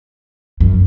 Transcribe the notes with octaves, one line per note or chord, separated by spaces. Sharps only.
F#2